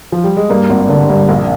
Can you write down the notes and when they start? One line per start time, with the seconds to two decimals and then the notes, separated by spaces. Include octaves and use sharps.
0.12 F3
0.24 G3
0.37 G#3
0.50 G2 A#3
0.70 G#1
0.89 D3
1.09 G2
1.29 A#1